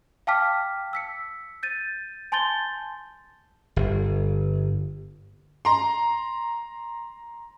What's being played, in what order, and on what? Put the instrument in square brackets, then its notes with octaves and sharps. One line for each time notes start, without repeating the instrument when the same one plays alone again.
[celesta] F5 G5 A5 D6 F6 B6
E6 B6 C#7
G6 A6 D#7
G#5 A5 C6 G6 A6 G7
[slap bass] G1
[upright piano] A#5 C6